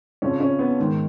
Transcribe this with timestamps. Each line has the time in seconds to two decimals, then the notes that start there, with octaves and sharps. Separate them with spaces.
0.22 F2 C#3 F3 C#4
0.40 C#4
0.59 B3
0.79 G#2 D#3